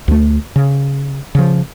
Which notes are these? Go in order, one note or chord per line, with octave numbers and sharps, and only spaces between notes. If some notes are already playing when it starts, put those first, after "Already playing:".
D2 A3
C#3
C#3 F3